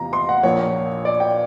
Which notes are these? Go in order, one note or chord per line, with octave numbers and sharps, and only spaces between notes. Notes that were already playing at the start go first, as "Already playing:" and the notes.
Already playing: E2 C3 F3 A#5
C6
F#5
A#1 A#2 F3 C#5
D5
G5